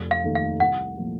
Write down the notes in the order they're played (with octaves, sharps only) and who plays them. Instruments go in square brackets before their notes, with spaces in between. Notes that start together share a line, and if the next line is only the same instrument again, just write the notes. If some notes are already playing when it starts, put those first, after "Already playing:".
Already playing: [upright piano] F1
[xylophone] F5
[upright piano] D#2 D#3 A3
[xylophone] F5
[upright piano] C2 [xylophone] F#5
[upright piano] A#2 F3 A3